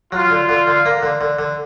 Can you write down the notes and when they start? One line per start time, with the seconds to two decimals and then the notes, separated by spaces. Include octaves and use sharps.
0.12 F#3 F4
0.30 D3
0.49 D3
0.67 D3
0.86 A#3
1.03 D3
1.21 D3
1.39 D3